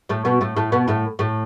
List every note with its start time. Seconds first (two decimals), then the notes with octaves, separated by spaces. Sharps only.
0.09 A2 A3
0.25 B2 B3
0.41 A2 A3
0.56 A2 A3
0.72 B2 B3
0.88 A2 A3
1.19 A2 A3